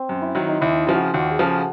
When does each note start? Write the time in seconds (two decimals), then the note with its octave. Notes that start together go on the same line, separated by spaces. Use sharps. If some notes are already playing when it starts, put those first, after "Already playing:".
Already playing: C4
0.09 F#2
0.22 E4
0.35 D#3 F#3
0.48 D#4
0.61 D#2 E4
0.87 C#3 F3 F4
0.94 F#4
1.02 F4
1.14 D#2 F#4
1.30 G#4
1.39 C#3 F3 A4